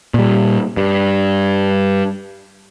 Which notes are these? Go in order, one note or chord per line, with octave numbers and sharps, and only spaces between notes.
A#2 G3
G2